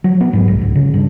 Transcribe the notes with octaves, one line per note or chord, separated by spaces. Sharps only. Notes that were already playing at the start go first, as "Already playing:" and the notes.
F#3
B3
G#2
B1
C#2
C#3
G2